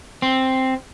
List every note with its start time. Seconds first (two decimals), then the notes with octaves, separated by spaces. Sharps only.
0.22 C4